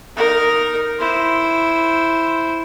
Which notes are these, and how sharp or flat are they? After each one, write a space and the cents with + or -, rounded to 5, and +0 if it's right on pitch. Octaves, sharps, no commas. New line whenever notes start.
D#4 +0 A#4 +0
E4 +0 C5 +0